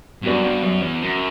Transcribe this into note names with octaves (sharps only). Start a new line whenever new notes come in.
F#2 G3 B3 D4 F#4 B4
G2
F#2
E2
F#2